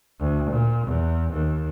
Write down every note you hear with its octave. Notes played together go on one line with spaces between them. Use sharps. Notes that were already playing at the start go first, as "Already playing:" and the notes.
D2
A#2
E2
D#2